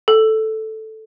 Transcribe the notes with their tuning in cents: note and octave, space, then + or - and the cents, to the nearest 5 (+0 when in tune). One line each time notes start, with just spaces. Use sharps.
A4 +0